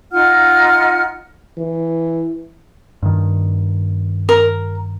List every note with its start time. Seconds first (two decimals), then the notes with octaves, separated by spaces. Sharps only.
0.12 D#4 F4 F#5 F6
1.58 E3
3.03 G2 D#3
4.29 A#4